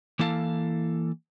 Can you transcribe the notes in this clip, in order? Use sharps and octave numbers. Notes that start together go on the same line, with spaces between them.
E3 A#3 E4 A4 F5 A5